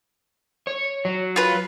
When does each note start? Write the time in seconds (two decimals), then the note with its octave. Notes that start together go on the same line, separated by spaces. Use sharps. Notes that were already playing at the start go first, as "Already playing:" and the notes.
0.67 C#5
1.05 F#3
1.36 F4 B4